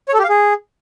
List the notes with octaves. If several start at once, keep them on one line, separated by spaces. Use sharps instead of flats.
C#5
A4
G4
F5
G#4